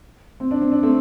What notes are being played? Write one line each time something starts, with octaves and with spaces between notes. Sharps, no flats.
C4
D4
C4
D4
A3 C4